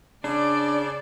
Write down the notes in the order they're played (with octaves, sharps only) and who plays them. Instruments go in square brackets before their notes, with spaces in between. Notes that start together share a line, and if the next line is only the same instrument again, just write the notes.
[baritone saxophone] C#3 [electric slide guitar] D4 [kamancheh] D5